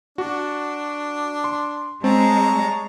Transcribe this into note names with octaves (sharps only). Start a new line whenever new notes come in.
D4 F#4
C6
G#3 C4 C#5 A5 A#5